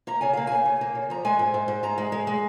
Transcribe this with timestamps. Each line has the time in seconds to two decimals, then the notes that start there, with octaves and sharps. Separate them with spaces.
0.07 A#3 A#5
0.21 C#3 G#5
0.33 A#3 F5
0.47 C#3 G#5
0.65 C#3
0.81 A#3
0.95 C#3
1.10 F3 A#5
1.25 G#3 G#5
1.39 G#2
1.54 G#2
1.68 G#2
1.83 G#2 A#5
1.98 G#3
2.12 G#3
2.27 G#3